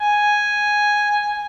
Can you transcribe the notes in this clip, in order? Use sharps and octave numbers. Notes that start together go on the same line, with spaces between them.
G#5